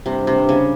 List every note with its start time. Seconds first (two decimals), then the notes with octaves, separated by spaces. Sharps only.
0.06 G2 C3
0.21 G2
0.27 C3
0.38 G2
0.49 C#3